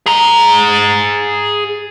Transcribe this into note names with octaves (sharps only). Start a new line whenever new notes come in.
G#4 A#5